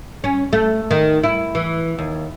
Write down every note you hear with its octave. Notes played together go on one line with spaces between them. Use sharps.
C#4
A3
D#3
E4
E3
D#2